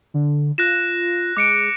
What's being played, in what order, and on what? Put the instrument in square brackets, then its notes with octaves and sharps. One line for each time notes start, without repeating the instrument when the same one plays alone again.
[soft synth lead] D3
[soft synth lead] F4 [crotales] F#6 A#6 E7
[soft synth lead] G#3 [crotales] D6 C#7 D7